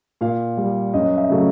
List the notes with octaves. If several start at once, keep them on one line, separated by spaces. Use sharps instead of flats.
A#2 F5
G3
F#2 D#5
E5
C#3 F#3 A3